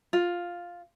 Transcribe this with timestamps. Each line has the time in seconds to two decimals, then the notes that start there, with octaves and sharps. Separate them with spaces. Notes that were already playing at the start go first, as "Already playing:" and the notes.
0.13 F4